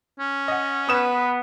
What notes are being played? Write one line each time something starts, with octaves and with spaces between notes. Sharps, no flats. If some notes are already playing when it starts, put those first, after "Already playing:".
C#4
D#5 F#5
B3 B4 D#6 E7